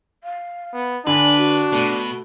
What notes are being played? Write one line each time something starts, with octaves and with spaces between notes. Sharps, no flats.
F5
B3
D3 D4 B4 G#5
F#4
B2 A3